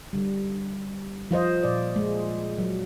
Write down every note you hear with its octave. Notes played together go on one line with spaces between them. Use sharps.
D3 G3
F3 F4 C5 D#5
A#2 D5
G#3
F#3